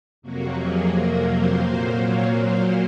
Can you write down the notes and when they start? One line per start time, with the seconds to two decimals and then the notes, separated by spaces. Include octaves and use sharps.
0.22 F2 C3 F#3 A#3 F#4
0.58 G#4
0.93 A#4
1.29 C5
1.65 A#2 F#3 A#3 C5
2.00 C#5
2.36 C5